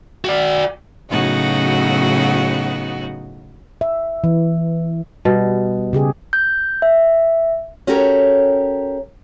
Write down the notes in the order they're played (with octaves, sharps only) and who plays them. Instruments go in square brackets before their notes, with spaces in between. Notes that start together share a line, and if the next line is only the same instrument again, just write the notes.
[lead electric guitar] F#4 D5
[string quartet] A2 C#3 F#3 B3 D#4 F#4
[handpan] E5
E3
[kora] B2 [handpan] G3
[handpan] C#3 G4 G#4
[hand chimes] G6
E5
[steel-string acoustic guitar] C#4 F#4 G4 A4 A#4 C#5